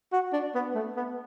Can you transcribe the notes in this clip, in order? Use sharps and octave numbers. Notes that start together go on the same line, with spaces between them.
F#4
D4
B3
A3
B3